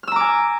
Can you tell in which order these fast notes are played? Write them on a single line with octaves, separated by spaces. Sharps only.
F6 E6 A#5 D6 G#5